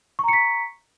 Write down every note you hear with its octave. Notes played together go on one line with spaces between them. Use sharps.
A#5 C#6 B6 C#7